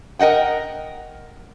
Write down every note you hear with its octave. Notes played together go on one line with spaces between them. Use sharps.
A#4 D#5 F#5 G5